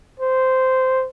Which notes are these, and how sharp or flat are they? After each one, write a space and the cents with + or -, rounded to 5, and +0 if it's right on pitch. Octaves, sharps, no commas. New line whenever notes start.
C5 -10